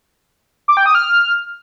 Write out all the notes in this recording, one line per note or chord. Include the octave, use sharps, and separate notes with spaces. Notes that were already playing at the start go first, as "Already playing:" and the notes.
D6
G5
D#6
F6